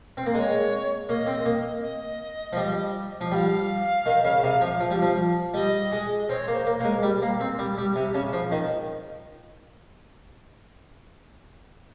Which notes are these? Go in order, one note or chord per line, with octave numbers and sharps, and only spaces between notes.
C4
A#3
G#3 C#5 D#5
A#3 D#5
C4
A#3
D#5
F3
G3
F3
G3 F5 G5
D#3
C#3
C3
F3
F3
G3
F3
G3 D#5
G#3
C4 C#5
A#3
C5
A#3
A#3 A#4
G#3
G3
A#3
C4
G3
G3
C3
C#3
F3
D#3